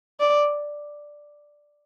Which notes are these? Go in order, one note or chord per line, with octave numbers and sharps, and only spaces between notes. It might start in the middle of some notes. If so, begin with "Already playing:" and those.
D5